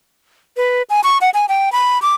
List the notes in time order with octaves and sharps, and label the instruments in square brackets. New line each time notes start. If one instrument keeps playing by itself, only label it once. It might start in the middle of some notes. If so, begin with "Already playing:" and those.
[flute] B4
G#5
C#6
F#5
G#5
G5
B5
D6